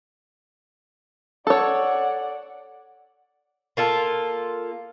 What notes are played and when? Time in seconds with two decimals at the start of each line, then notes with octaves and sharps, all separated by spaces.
1.47 A4 C#5 D5 F#5
3.77 A#3 F4 A4